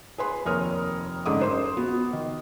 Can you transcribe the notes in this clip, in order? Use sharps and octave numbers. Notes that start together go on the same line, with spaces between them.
G#4 B4 C6
F1 D#2 A#4 C#5 D#6 F6
A1 G#2 D3 D#4 D6 D#6
F#2 C5 C6
B3 F#4
D#3